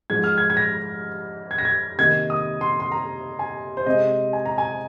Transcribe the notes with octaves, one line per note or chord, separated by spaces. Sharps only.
G#2 F3 G#3 G#6
F6
G#6
G#6
A#6
G#6
A#6
G#6
C3 D#3 A#3 G#6
D#6
C6
C6
A#5
G#5
C5
C3 G#3 C4 D#5
G#5
A#5
G#5